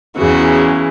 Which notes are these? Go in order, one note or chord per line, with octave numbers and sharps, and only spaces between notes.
E2 C#3 E3 F#4